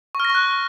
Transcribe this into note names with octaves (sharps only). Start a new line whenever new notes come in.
C#6
F6
A#6
C#6
F#6